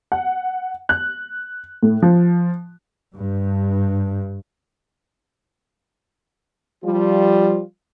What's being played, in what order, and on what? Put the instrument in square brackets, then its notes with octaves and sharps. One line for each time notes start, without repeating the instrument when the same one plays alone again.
[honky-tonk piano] F#5
F#6
A2
F3
[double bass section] G2
[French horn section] F3 G3 F4